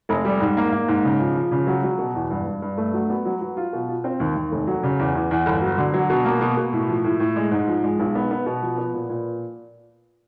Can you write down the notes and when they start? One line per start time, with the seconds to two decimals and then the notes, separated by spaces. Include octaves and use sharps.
0.09 F1
0.25 G3
0.41 G#2
0.57 A#3
0.72 A#3
0.88 G#2
1.05 C#3
1.20 F3
1.35 F3
1.51 C#3
1.67 F#3
1.83 F#3
1.99 B2
2.15 E2
2.30 G2
2.46 G2
2.62 G2
2.77 A3
2.93 F#3
3.10 B3
3.25 F#3
3.41 F#3
3.57 F4
3.73 B2
3.89 F4
4.04 C4
4.20 D#2
4.35 D#2
4.52 F1
4.67 F#3
4.83 C#3
4.99 E2
5.15 E2
5.31 E2
5.46 G1
5.62 F#3
5.78 D3
5.94 F#3
6.10 B2
6.25 A#3
6.41 B2
6.57 B2
6.73 A2
6.89 F3
7.04 A2
7.20 A2
7.36 G#3
7.51 G#2
7.67 F3
7.83 G#3
7.99 B1
8.15 B3
8.31 B3
8.46 B2
8.62 F3
8.78 B3
8.94 A#2
9.09 A#2